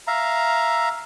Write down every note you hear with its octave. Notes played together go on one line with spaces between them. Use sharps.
E5 F5 A#5